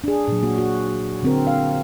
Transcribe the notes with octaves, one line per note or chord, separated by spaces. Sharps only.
D4 G#4
A#2 F#3
A#3 F#4
F#4
D3 C4 A#4
F5